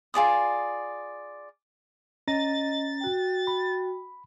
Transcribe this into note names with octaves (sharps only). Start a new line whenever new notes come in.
F4 G#4 D5 D#6
C#4 D#5 A#5 A6 A#6
F#4 G5
B5